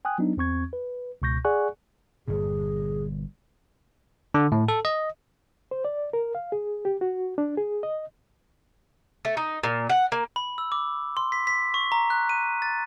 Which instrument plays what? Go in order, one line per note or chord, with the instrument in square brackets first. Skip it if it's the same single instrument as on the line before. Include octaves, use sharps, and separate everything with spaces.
[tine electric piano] G5 G#5 D#6 F#6
F#3 B3 D4 D#4
E2 C4 C#6 G#6
B4
C#2 B2 C#6 G6 A#6
G#4 D5 F#5 G#5 C#6 F#6
[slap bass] G1 G2 A#2 [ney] G#4
[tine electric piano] D3
A2
A4
D#5
[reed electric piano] C5
D5
A#4
F5
G#4
G4
F#4
D4
G#4
D#5
[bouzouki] A3
D#4
A#2
F#5
A#3
[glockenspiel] B5
E6
D6
C6
B6
B6
C#6
A#5
F#6
D#7
A6